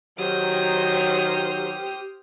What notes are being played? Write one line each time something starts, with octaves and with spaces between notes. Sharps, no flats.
D#3 F#3 G4 C5 D#6 F6